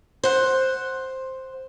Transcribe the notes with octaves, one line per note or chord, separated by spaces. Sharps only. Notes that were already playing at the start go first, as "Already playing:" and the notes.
C5 F#5